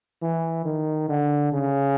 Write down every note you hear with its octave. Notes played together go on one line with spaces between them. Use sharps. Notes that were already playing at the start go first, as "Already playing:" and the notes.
E3
D#3
D3
C#3